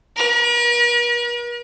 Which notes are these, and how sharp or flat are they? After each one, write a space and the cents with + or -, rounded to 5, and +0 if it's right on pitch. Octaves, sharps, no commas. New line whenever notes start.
A#4 +45